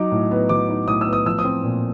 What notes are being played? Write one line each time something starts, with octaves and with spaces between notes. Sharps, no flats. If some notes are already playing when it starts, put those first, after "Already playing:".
Already playing: F#3 D#4 D6
A2
B3
F#3 D6
D#4
A2 D#6
E6
B3
D#6
F3 E6
D#6
C4
A#2